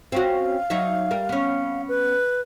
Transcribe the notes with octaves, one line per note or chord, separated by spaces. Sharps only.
C4 C#4 F#4 F5
F#3 D#4 E5
G3 A#4
B3 C#4
B4